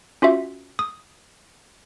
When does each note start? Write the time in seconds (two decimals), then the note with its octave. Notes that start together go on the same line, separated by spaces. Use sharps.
0.22 C#4 F4 F#4 E5
0.79 D#6